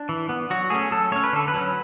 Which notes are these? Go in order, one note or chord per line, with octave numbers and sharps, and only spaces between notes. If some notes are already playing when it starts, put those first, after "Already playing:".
Already playing: D4
E3
B3
F#3 F#4
A3 C#4 G#4
F#3 A4
A3 C#4 C#5
B4
D3 A4
B4
F#3 C#4